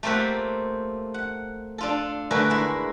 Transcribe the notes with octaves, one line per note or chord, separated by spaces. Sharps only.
A3 A#3 C4 F4 G4 F#5
F#5
D4 F4 A4
D3 A3 F#4 G#4 A#4 B4
G#3 E4